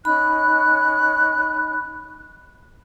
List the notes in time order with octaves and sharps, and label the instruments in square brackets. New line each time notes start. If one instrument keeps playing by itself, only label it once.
[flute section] C#4 D#4 F#6 [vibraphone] B5